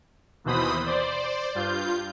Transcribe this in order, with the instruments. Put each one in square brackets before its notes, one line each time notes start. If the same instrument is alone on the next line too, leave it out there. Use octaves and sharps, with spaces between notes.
[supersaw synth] D#2 B2 E3 C5 B5 D#6
C5 D5
G2 F4 G6